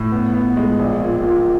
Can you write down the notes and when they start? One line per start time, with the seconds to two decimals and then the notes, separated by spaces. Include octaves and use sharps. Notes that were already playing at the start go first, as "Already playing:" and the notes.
Already playing: A2
0.12 B3
0.34 B3
0.57 G#3
0.79 A#1
1.01 A#2
1.23 A#2